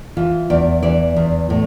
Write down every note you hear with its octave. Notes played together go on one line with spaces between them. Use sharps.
E3 F4
E2 D5
E3 D5
E2
A2